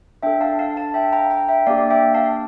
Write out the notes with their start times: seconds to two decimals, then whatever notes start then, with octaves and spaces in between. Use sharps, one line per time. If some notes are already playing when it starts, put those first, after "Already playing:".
0.23 D4 A4 E5 G5
0.41 F5 A5
0.59 F5 A5
0.76 F5 A5
0.94 E5 G5
1.13 G5 A#5
1.30 G5 A#5
1.48 E5 G5
1.67 A#3 D4 G4 D5 F5
1.90 E5 G5
2.14 F5 A5